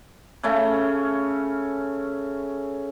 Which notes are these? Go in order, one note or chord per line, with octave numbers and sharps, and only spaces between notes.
C#3 A3 C#4